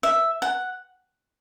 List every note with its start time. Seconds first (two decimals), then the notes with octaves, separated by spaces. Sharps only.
0.03 E5
0.42 F#5